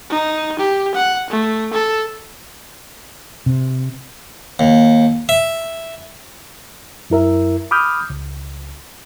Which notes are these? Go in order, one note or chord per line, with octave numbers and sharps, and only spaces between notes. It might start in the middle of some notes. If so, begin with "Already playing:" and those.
D#4
G4
F#5
A3
A4
C3
D#2
E5
F#2 E4 A#4 E5
B5 D6 D#6 F6 G6
C#2